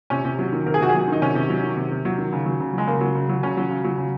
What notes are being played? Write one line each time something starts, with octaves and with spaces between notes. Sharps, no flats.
C3 C#4
C3
F#3
D#3
C3 A#4
G#4
C3 F#4
G#4
F#3
D#3 D#4
C3 C#4
C3
F#3
D#3
C3
C3
F#3
D#3
C#3
F#3
C#3
F#3 G#3
C#3 A#3
F#3
C#3
F#3
C#3 C#4
F#3
C#3
F#3
C#3